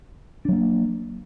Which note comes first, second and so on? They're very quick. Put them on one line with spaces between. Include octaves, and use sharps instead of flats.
D4 F#3 A#3